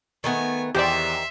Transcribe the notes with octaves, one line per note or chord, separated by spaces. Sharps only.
D#3 A3 B3 G#5
E2 D#3 G4 C5 D5 E5 G5 C6